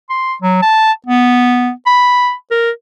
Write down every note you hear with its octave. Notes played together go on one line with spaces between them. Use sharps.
C6
F#3
A5
B3
B5
A#4